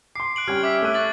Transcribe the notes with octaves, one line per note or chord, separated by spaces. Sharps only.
C6 D6 C7
F#6 D7 F#7
G3 C#4 G4 F6 G#6 D7
E5 D6 F6 B6
A3 F#6 D#7
C#6 A6 F#7